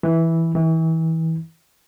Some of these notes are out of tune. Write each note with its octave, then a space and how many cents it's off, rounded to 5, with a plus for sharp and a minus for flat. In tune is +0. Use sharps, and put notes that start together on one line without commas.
E3 -5
E3 -30